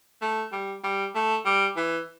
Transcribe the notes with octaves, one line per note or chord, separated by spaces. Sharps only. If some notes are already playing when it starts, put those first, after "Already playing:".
A3
G3
G3
A3
G3
E3